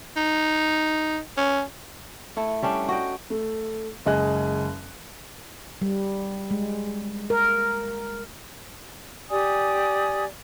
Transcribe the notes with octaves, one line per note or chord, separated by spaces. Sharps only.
D#4
C#4
A3 E4
G3 C#4 D4
F#4 D#5 G5
A3
F#1 G#3 D#5 G#5 F#6
G3
G#3
A#4
G4 D5 G#5 D#6